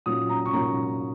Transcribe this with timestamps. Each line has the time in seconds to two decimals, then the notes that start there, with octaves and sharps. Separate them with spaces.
0.06 A#2 F#3 A#3 C#4 D#6
0.29 A#5
0.46 C#6
0.52 A#2 F#3 A#3 C#4 A#5